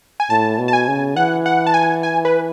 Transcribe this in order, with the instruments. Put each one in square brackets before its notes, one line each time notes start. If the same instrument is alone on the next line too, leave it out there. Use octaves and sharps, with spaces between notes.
[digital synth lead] G#5
[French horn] A2 [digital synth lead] A5
[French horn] B2
[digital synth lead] A5
G#5
[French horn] C#3
[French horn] E3 [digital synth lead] F#5
[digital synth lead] F#5
A5
G#5
G#5
B4